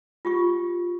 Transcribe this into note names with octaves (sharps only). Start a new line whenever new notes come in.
F4 G4 C#6